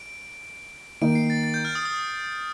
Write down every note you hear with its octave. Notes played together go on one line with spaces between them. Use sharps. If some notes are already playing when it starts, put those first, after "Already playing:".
Already playing: D7
D#3 A#3 D#4 D7
C7
A6
A6
G6
F6
D#6
D#6